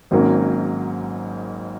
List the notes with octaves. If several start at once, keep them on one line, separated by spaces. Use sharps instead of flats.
G#1 G#2 F#3 A#3 C#4